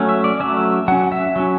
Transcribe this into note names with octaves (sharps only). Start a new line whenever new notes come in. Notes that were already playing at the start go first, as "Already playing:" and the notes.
Already playing: F#3 A3 C#4
E5
D5
F#3 A3 C#4 E5
F#3 C#4 F#5
E5
F#3 C#4